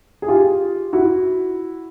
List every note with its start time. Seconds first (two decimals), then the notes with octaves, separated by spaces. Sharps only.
0.22 G#4
0.28 F4 G4
0.93 E4 F#4